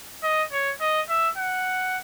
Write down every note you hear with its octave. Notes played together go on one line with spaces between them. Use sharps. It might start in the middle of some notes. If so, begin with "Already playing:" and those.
D#5
C#5
D#5
E5
F#5